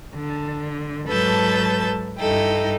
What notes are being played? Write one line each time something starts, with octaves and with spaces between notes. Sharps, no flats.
D3
G#2 F#3 A4 B4 A5 G6
G2 D#4 E4 A4 G5